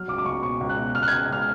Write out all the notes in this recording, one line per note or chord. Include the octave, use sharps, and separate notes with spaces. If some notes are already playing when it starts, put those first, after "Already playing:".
Already playing: F#3 F6
C#2 D6
D6
C#2 C#6
B2 C#6
C#2
F#6
B2
C#2 F6
F#6
C#2 G#6
C#2 F6